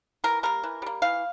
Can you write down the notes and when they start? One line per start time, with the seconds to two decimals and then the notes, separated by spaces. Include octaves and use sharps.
0.24 E3 A#4
0.43 G3 A#3 A#4
0.63 E3
0.82 G3 A#3
1.02 E3 F5